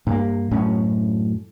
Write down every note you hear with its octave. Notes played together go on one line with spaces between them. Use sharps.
G2 A#3
F#2 A2 C#4